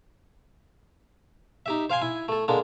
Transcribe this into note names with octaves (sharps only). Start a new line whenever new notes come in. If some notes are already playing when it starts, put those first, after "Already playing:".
D#4 G4 E5
C5 F5 G5 G#5 C6
E4 G#5
A3 A4
D3 G#3 A#3 D4